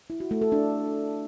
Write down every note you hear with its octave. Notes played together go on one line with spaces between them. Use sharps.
E4
F#4
A3
A4
D4